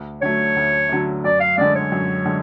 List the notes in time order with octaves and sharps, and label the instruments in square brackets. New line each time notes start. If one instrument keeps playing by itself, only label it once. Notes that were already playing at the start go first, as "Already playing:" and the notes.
Already playing: [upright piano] D2
[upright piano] D3 F#3 A3 [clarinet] C#5
[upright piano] D2
D3 F#3 A3
[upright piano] F#2 [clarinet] D5
[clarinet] F5
[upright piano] D3 G#3 [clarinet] D5
[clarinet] C#5
[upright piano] F#2
D3 G#3